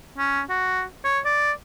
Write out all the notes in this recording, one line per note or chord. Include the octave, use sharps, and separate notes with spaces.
C#4
F#4
C#5
D5